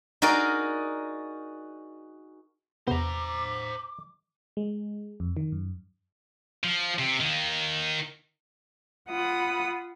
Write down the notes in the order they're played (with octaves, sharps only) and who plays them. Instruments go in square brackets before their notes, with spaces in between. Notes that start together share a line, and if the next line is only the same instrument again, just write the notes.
[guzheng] D#4 F#4 G#4 A#4 D5
[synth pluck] E2 C3 [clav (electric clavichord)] B3 [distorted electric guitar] C5 A#5 [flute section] D6
[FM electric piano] G#3
F2
D#3
F#2
[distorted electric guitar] F3
C3
D#3 A#3
[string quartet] F4 F#5 B5 D#6